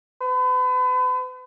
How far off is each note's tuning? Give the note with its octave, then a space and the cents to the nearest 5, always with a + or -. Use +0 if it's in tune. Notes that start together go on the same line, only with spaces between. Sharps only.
B4 +40